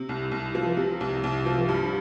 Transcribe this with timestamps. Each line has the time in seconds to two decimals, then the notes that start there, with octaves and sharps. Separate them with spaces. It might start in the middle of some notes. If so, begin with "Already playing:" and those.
Already playing: C3
0.09 C2
0.31 C2
0.55 F3
0.77 C3
1.01 C2
1.23 C2
1.46 F3
1.69 G2